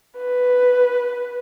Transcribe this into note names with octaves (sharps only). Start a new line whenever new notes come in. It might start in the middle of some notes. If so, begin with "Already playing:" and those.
B4